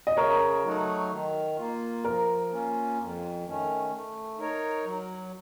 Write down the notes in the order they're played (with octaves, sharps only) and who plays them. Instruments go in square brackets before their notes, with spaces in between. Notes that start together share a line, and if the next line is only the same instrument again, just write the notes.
[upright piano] D#5
[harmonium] C#3 [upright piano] A#4 C#5
[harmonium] F#3 A3 D#4 F#4
D#3
A#3 F4
[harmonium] F3 [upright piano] A#4
[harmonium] A#3 C#4 F4
F2
D#3 A3 C#4
A3
D#4 A#4 C#5
F#3